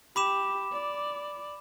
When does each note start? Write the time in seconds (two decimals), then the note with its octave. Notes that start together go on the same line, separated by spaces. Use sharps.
0.16 G4 B5 D6 E7
0.72 D5